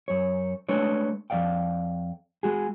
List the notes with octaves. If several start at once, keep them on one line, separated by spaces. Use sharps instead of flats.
F#2 C#5
G#3 A3 D4 B4 C#5
F2 G#2 D5 F5 G5
G#3 F#4 G#4